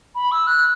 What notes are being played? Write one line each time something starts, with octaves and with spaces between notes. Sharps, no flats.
B5
E6
F#6